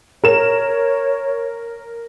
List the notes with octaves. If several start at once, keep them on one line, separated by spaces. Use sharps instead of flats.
A#4 C#5 E7